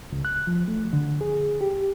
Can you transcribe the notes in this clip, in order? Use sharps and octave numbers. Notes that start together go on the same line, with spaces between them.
C#2
F#6
F3
A3
D3
G#4
G4